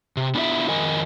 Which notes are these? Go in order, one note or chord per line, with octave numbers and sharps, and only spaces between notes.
C3
B3 D4 E4 F4 C5 E5
F2 D#3 A#4 D#5 G#5